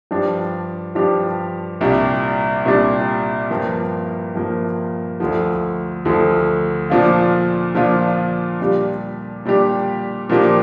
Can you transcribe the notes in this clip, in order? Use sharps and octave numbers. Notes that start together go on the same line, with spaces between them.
G2 F3 D4 G4
G2 F3 D4 G4
C2 A#2 G3 D4
C2 A#2 G3 D4
G2 F3 A#3
G2 F3 A#3
D2 D3 F3
D2 D3 F3
A#2 F3 D4 F4
A#2 F3 D4 F4
A#2 G3 D4 G4
A#2 G3 D4 G4
A#2 F3 A#3 D4 G4